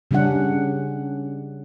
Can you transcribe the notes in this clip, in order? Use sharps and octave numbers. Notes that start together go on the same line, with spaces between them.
C#3 G3 C#4 D4 F#5